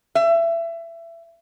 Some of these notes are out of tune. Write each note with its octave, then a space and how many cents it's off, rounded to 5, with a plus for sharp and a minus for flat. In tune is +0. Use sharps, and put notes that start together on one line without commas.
E5 +25